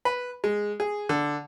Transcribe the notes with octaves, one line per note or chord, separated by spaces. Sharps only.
B4
G#3
G#4
D3